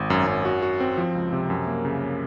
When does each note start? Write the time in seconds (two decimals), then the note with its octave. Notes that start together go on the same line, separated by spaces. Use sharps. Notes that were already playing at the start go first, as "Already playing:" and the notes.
Already playing: G#1
0.10 F#2
0.27 F#2
0.45 F#4
0.62 F#4
0.80 C4
0.98 F3
1.15 C#2
1.33 C3
1.50 F#2
1.67 A#3
1.85 C#3